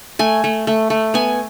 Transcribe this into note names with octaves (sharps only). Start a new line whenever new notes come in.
A3 G#5
A3
A3
A3
B3 G#5